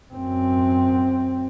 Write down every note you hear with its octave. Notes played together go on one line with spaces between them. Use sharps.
F#2 C4